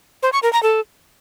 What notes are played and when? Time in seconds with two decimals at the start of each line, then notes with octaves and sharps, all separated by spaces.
0.23 C5
0.33 C#6
0.43 A#4
0.53 A#5
0.63 A4